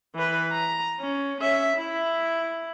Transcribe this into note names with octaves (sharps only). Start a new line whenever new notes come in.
E3 B4
A#5
C#4
C#4 E5
E4